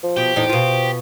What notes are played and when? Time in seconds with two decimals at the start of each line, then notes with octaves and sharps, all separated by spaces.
0.03 F3
0.17 B2 G4
0.36 E2 A2 D#4 C5
0.49 B2 F4